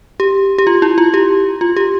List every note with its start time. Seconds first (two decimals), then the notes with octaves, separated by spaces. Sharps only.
0.20 G4
0.58 G4
0.67 F4
0.82 E4
0.98 F4
1.14 G4
1.61 F4
1.76 G4